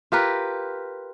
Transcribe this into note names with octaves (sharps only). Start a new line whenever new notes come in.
F4 G4 A#4 B4